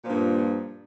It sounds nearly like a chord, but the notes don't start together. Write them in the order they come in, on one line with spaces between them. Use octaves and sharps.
A#2 F3 G2